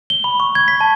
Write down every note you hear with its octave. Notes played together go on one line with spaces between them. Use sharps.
G7
B5
C#6
G#6
B6
A5